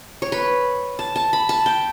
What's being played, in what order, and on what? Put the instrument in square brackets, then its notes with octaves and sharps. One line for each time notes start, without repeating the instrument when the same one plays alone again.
[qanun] C#5
B4
A5
A5
B5
A5
G5